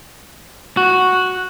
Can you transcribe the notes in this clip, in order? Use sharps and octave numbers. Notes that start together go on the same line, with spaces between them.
F#4